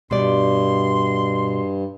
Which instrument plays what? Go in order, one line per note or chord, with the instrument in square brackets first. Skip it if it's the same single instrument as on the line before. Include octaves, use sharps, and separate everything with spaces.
[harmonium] G2 [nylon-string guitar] B2 G3 D5 [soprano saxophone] C6